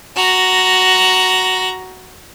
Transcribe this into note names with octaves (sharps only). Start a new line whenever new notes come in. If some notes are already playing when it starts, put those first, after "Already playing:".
F#4 A#5